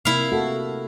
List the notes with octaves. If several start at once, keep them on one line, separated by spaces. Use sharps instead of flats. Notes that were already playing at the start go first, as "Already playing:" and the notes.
C3 A#3 E4 F5
A3 F#4 A4